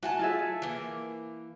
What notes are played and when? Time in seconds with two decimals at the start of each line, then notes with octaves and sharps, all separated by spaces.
0.03 A3 F#4 G#5 A5
0.19 F4 G#4 E5
0.62 E3 A#3